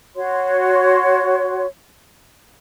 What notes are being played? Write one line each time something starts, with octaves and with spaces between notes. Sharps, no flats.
F#4 C#5 C6